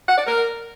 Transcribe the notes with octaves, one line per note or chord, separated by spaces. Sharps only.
F#5
D5
A#4